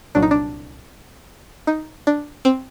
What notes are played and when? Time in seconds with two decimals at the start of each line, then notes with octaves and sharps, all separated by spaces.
0.15 C2 A#2 F#3 D4
0.22 D#4
0.31 D4
1.67 D#4
2.07 D4
2.45 C4